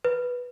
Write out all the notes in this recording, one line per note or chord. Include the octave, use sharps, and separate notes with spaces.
B4